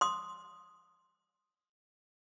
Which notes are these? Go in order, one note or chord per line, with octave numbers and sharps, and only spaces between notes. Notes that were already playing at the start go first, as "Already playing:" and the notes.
C6 D#6